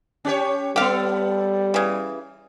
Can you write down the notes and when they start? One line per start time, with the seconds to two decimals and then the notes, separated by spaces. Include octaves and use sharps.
0.25 C#4 G4 C#5
0.76 G3 B3 G4 A4 F5
1.74 C#3 E3